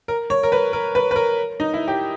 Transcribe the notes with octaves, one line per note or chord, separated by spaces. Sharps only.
A#4
C#5
A#4
B4
A#4
B4
B4
A#4
D#4
E4
G4